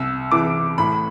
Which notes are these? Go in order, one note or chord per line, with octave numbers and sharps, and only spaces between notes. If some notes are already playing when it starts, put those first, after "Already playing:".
Already playing: C2 E6
E3 D6
A2 B5